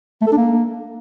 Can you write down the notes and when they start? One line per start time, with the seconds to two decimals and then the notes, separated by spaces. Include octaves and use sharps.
0.22 A3
0.27 A4
0.32 D4
0.37 A#3